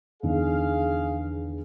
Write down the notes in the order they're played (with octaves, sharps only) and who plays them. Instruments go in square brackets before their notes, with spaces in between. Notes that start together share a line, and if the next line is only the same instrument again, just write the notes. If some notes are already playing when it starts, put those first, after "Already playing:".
[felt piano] E2 D3 D#3 [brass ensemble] G#4 F5